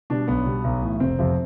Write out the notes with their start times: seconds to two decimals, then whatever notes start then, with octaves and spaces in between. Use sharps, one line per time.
0.10 B2 G3 D4
0.28 B1 B3
0.46 B2 G3
0.64 B1
0.82 A2 E3
1.00 F1 C4
1.19 F2 C3 F3